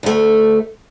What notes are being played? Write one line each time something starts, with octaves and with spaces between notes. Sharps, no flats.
D2 A3